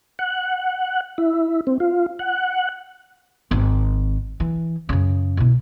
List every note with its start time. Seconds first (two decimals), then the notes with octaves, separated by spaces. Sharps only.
0.19 F#5
1.18 E4
1.67 C4
1.80 F4
2.19 F#5
3.51 G#1
4.40 E3
4.89 F#2 C#3
5.37 B2 E4